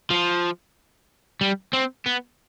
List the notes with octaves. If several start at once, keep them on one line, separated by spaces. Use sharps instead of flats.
F3
G3
C4
B3